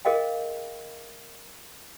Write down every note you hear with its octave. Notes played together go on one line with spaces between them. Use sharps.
G#4 A#4 D#5 F5 G5